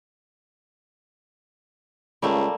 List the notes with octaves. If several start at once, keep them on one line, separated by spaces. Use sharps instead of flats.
C#2 G3 A3 A#3